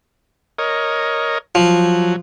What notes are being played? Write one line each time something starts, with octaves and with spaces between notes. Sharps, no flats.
A#4 C#5 D#5
F3 F#3